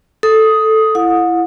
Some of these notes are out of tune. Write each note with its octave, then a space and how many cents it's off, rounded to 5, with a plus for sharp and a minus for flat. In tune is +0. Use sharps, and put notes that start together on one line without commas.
A4 +0 D#6 +10
E4 +20 F#5 -35 D#6 +0